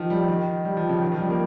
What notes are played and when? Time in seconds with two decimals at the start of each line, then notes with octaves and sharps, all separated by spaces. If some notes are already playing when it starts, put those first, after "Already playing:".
Already playing: D#3 F3
0.10 G3
0.28 D#3
0.65 G3
0.77 F3
0.89 C#3
1.02 D#3
1.12 F3
1.20 G3
1.30 A#3